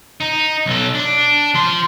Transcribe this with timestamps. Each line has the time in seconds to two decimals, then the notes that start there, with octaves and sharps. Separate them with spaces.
0.20 D#4
0.66 B1 A4
0.95 D4
1.54 F3 C6